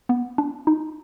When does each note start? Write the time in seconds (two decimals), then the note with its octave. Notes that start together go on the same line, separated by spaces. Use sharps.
0.09 B3
0.38 D4
0.67 D#4